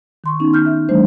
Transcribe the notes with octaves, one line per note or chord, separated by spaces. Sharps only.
D#3 C6 C#6
B3 C#4 D#4
F6 G6
E5
E3 G3 A3 D4 C5